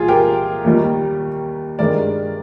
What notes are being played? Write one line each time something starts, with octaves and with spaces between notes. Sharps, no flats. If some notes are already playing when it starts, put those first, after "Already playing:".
Already playing: C2 A#2 G#3 F4 G#4
G4 A#4
D#2 D#3 G3
G2 D#3 G#3 A#4 D5